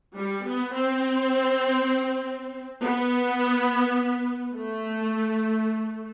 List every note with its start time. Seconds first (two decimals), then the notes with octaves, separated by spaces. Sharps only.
0.18 G3
0.47 B3
0.76 C4
2.81 B3
4.56 A3